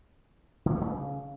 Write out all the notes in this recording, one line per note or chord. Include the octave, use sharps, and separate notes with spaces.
D3
A#3
A3
C#3